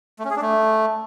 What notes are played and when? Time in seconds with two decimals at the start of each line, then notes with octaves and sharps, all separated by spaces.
0.19 A3
0.25 C#4
0.31 G#4
0.36 D4
0.42 A3